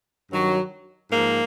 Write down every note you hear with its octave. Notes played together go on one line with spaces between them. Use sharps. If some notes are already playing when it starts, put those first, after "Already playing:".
G2 D#3 F#3
G#2 F3 A#3